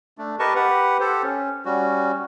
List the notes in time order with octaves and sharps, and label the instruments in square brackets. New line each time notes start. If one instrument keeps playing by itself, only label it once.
[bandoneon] A3 D4
G4 A#4 B4 D#5 A5 C#6
G4 B4 F#5
G4 A4 C5
C#4
G3 C#4 F#4